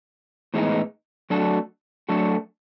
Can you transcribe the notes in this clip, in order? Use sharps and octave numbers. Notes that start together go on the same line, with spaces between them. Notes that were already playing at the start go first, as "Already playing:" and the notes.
A2 E3 G#3 B3 D#4
F#3 A3 D4 F#4 A4
F#3 A3 D4 F#4 A4